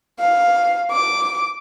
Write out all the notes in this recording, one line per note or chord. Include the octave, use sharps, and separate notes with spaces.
F5
D6